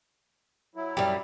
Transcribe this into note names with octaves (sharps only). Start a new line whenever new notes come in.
F#3 E4
F#2 G3 G4